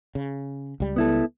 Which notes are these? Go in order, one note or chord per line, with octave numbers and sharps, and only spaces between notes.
C#3
C#2 G3
B3 E4 A4